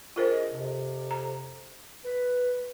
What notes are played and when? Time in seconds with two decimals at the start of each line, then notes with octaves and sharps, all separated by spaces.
0.16 D4 F4 G#4 A#4 C5 D#5
0.51 F2 C3
1.11 A#5
2.04 B4